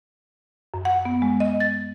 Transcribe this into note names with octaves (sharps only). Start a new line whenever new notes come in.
F#2
F#5
B3
G#3
D#5
A6